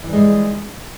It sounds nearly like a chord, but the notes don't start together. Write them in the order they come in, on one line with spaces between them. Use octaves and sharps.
E3 G3 G#3